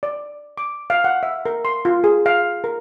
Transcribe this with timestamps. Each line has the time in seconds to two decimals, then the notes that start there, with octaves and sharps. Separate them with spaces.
0.03 D5
0.58 D6
0.90 F5
1.04 F#5
1.23 E5
1.45 A#4
1.65 C6
1.85 F4
2.04 G#4
2.26 F5
2.64 A#4